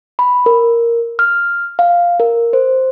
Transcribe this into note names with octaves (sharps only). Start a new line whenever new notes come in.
B5
A#4
F6
F5
A#4
C5